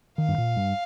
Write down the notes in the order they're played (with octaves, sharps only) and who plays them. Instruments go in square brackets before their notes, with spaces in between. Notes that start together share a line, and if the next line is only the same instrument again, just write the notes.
[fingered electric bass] D#3 [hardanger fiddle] F5
[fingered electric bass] G2
A#2
G2